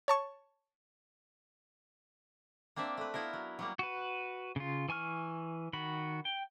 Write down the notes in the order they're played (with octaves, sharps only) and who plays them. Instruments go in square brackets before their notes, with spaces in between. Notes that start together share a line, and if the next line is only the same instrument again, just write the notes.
[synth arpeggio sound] C#5 A5 C#6
[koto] A#3 C4 D4 D5 E5
A3 B4
B3 E4 F4 A#4
F#3
F#3 G3 A#3
[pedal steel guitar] F#4 B4
C#3 F4
E3 G#5 C#6 F6
D#3 F#4 B5
G5